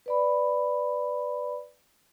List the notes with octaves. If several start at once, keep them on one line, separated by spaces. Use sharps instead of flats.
B4 D5 B5